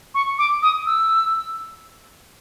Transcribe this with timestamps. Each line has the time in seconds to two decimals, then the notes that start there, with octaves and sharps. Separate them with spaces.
0.14 C#6
0.38 D6
0.62 D#6
0.86 E6